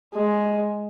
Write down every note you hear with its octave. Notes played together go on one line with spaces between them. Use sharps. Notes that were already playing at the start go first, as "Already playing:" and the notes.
G#3